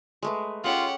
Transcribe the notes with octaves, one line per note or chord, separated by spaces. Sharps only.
G#3 A3 B4
G#3 C#4 F4 G4 A4 F#5